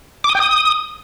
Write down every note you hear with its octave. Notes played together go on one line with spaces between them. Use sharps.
D6
D#6
G5
D#6